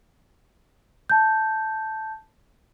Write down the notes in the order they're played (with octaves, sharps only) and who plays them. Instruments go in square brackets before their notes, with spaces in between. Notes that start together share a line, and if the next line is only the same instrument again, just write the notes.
[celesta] A5 G6